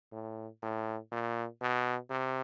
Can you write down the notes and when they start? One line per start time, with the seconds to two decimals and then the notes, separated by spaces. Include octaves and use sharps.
0.12 A2
0.62 A2
1.11 A#2
1.61 B2
2.10 C3